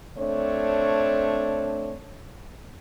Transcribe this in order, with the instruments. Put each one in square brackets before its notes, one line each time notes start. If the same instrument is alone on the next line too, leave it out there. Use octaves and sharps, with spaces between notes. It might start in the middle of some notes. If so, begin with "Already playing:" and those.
[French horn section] A3 C4 D4 C#5